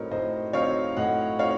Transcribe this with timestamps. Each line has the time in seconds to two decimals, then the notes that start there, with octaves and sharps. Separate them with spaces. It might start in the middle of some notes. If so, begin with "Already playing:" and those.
Already playing: A2 F#3 C4 D#4 A#4 C#5
0.11 A2 C5 D#5
0.53 F#3 C4 D#4 C#5 F5
0.97 A2 D#5 F#5
1.39 F#3 C4 D#4 C#5 F5